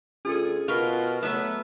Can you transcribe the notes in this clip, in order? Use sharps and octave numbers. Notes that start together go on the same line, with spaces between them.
D2 C#4 F4 G#4 A4
B2 F4 A#4 B4 C#6 F6
F#3 A3 B3 E5